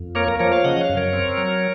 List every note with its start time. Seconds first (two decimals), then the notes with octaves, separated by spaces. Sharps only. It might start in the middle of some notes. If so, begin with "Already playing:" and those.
Already playing: F2
0.15 A#3 A#4 C#5
0.28 A#4
0.39 F3 A#4 C#5
0.52 C#5 F5
0.64 C#3 D#5 F#5
0.81 C#5 F5
0.89 F#2
0.97 A#4 C#5
1.13 C4
1.38 F#3